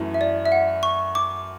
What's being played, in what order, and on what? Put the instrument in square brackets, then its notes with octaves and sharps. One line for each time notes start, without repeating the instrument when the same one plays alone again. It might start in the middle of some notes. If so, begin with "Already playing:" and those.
Already playing: [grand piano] F#2 E3 A3 E4
[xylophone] E5
D5
E5
F#5
C#6
D6